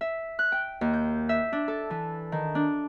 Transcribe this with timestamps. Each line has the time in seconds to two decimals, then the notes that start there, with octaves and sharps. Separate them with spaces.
0.01 E5
0.39 F#6
0.52 G5
0.81 D#2
0.93 G6
1.29 E5
1.53 D4
1.68 A4
1.90 E3
2.32 D#3
2.55 D4